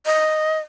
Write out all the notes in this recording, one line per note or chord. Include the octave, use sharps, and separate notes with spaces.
D#5